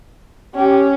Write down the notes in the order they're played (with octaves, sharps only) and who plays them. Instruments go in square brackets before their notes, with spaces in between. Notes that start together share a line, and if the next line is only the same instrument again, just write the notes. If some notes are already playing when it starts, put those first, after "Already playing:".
[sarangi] C#4 [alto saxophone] G4